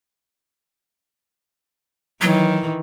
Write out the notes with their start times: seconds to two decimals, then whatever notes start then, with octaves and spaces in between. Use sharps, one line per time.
2.21 D#3 E3 F#3